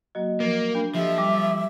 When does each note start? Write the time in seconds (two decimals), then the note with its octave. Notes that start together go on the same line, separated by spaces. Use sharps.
0.15 F#3 A#3 F#4 D#5
0.40 F3 A#3
0.75 D4 B5
0.95 F3 G4 A4 D#5 E5
1.18 G3 D6